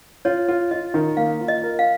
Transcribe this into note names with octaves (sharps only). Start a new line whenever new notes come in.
F4 C#5
F4
F4 D#5
D#3
A#3 F5
F4
D#5
A#4
F5